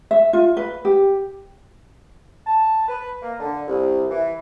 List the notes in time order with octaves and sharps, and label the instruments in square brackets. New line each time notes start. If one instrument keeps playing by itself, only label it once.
[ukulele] E5
F4
B4
G4
[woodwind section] A5
B4
A#3
D3
C2
E3